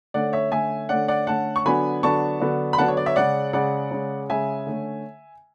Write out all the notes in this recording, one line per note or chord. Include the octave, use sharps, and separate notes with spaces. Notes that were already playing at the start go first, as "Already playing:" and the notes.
D3 A3 C#4 D5 F#5
C#5 E5
D3 A3 C#4 E5 G#5
D3 A3 C#4 D5 F#5
D5 F#5
D3 A3 C#4 F#5 A5
C#6
D3 F#3 B3 D4 G#5 B5
D3 F#3 B3 D4 A5 C#6
D3 F#3 B3 D4
B5
D3 F#3 B3 D4 F#5 A5
C#5
D5
C#5 E5
C#3 G#3 C#4 D5 F#5
C#3 G#3 C#4 D5 F#5
C#3 G#3 C#4
C#3 G#3 C#4 E5 G#5
D3 A3 C#4